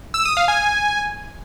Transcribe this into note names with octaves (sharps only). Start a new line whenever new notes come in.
E6
D#6
F5
G#5